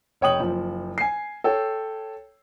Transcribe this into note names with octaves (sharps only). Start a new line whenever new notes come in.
F1 C#5 G5 D#6 F#7
F#1 F3
G#5 C7
A4 C#5 G5